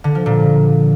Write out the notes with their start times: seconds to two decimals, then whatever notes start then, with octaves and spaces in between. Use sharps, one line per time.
0.04 D3
0.15 F3
0.26 A#2